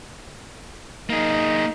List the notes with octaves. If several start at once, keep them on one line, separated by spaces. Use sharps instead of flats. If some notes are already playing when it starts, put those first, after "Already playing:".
A#3 D#4 G#4